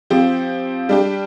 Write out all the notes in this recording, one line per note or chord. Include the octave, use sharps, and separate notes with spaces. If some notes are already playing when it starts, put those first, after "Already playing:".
F3 C4 G4
G3 D4 G4